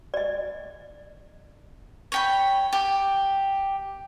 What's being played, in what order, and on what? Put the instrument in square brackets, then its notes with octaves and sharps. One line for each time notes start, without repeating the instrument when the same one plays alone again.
[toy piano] D5 D#5
[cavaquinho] C#5 G5 B5
G4